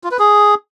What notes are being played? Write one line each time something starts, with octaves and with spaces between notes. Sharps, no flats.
F4
B4
G#4